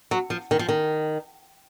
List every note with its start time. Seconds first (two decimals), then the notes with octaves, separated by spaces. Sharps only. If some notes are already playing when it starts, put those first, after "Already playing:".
0.11 F#3
0.30 F3
0.51 D#3
0.59 F3
0.69 D#3